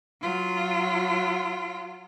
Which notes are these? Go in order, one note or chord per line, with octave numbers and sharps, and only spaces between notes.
F#3 F4